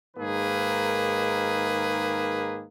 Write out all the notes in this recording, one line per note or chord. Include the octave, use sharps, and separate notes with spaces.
G#2 D#3 A#3 G#4 B4